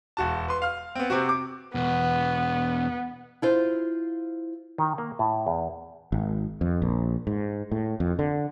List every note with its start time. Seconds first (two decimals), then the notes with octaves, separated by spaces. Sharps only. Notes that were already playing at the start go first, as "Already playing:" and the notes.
0.17 E1 F#4 A5
0.48 B4 C6
0.62 F5 F6
0.95 B3 C4
1.10 C3 C4 F#4
1.29 D6
1.75 E2 B2 B3
3.42 E4 F4 C5
4.78 D#3
4.98 A#3
5.19 A2
5.47 E2
6.12 G#1
6.61 F2
6.82 A#1
7.27 G#2
7.72 A2
8.00 F2
8.19 D3